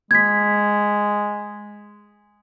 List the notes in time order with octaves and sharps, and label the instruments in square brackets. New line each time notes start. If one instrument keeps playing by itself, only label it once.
[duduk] G#3 [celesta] G#6 B6